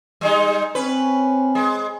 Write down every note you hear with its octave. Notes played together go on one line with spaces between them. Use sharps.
G3 G#3 D#4
C4 C#4 B4
G#3